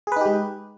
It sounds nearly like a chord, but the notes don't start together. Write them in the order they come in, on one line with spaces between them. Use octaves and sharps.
G#4 B4 D#4 G4 G#3